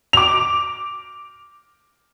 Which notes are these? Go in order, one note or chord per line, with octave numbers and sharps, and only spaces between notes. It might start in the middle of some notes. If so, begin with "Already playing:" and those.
D6 F7